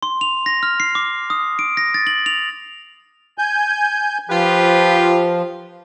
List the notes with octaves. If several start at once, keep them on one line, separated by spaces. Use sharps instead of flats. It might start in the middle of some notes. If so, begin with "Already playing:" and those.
C6
F7
A#6
F6
C7
D6
D#6
D7
A#6
A6
F#7
F7
G#5 G6
F3 F4 G4 B4